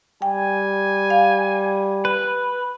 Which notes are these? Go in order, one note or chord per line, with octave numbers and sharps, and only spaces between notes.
G3 G5 G#5
F5
B4